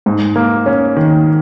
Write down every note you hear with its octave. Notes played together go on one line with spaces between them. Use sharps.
G#2
A#3
C#4
D#3